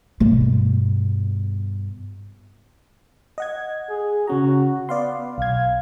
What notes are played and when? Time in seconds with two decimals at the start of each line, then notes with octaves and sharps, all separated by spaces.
0.20 G2 B2
3.38 D#5 F#5 G#6
3.90 G#4
4.27 C#3 C#4 F#4 A#5
4.89 B3 D5 F5 C6
5.38 B1 F5 G#6